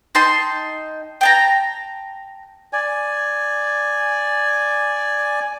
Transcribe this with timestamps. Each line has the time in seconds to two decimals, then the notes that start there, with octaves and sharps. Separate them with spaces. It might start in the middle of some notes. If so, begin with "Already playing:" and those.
0.15 D#4 G5 A5 C6
1.21 G5 A5 A#5
2.73 D5 G#5